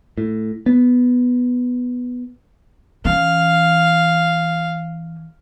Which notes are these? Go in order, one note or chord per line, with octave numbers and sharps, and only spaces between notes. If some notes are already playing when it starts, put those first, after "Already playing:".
A2
B3
E3 C#4 F5